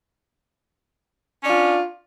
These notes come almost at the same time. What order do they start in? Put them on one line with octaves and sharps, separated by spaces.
C#4 D4 F4